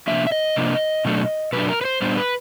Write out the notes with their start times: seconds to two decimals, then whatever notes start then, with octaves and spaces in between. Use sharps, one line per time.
0.08 C3 F3 A#3 D4 E5
0.27 E5
0.32 D#5
0.56 C3 F3 A#3 D4
1.05 B2 F#3 A3 D4
1.53 B2 F#3 A3 D4 B4
1.69 A#4
1.81 B4
1.85 C5
2.02 A#2 G3 B3 D4 C5
2.17 B4